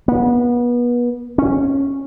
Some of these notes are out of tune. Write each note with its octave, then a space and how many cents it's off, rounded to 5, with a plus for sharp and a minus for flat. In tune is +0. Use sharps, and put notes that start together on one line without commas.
B3 -30
C#4 -10